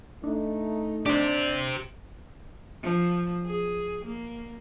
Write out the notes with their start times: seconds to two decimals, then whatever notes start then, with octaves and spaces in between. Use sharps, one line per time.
0.24 A3 D4 D#4
1.06 D4 G4 C5 D5
2.83 F3
3.45 G#4
4.05 A#3